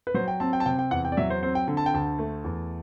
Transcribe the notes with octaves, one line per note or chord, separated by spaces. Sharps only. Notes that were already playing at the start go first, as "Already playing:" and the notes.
B4
F#3 C5
G5
C4 A5
G5
A5
C3 G5
G5
E2 F#5
G5
D5
F#3 E5
C5
C4 C5
G5
D3
A5
G5
D2 A5
A3
E2